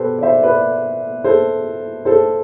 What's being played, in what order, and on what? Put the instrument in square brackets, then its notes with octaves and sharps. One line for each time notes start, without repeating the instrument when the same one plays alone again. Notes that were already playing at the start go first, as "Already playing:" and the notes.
Already playing: [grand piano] B2 G4 A4 B4 C5
D5
C5 E5
B4 D5
A4 C5
A4 C5